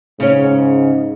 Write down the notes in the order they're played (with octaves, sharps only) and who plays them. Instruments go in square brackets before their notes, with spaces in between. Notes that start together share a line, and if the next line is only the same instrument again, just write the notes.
[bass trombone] G#2 [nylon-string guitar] C#3 C#4